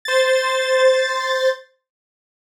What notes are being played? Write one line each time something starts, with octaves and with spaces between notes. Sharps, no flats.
C5 A6